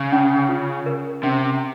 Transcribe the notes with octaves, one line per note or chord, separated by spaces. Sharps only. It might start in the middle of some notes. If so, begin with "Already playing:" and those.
Already playing: C#3
C#4
F4
A#4
C3 C#4